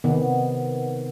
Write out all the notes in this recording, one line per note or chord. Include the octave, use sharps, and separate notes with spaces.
C3 D#3 B3